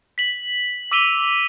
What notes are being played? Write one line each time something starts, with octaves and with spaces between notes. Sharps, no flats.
B6 F#7
D6 E6 B6 D#7 F7 G7